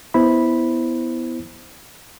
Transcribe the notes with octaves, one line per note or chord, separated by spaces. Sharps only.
B3 E4 C5 B5